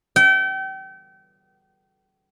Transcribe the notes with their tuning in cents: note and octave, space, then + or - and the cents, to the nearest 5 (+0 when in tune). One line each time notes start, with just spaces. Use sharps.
G5 -35